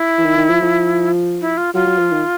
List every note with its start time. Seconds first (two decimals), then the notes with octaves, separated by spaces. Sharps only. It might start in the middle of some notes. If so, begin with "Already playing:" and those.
Already playing: E4
0.18 E3
0.24 D#3
0.37 D#3
0.49 F3
0.62 F3
1.41 E4
1.57 F4
1.74 F#3 F4
1.87 F#3
1.98 F3
2.12 D#3